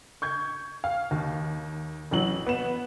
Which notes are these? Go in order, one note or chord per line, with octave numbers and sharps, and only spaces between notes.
C#6 G6 G#6
F5
D#2
A1 E3 F#3 F#7
B3 E7